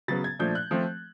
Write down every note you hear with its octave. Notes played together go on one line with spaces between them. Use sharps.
C#3 F#3 B3 A6
G#6
A#2 F3 A3 D4 G6
F#6
F3 A3 C4